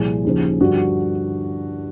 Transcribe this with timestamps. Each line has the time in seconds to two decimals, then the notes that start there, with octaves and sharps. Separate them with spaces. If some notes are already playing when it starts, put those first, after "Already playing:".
Already playing: C2 A#2 F3 G#4
0.25 D#2 C#3 F3
0.60 G2 D3 F3 F#4